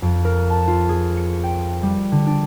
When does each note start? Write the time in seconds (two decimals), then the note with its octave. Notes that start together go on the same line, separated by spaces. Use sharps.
0.02 F2
0.25 A#4
0.50 A5
0.68 F4
0.89 G#4
1.17 C#7
1.43 G5
1.83 G3
2.12 D3
2.26 D4